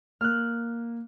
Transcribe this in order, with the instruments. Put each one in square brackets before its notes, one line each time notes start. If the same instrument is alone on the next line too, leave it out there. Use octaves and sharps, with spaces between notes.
[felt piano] A#3 [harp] F6 F#6